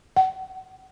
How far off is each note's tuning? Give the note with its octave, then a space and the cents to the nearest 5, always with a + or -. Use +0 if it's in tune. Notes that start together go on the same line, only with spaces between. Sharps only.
F#5 +40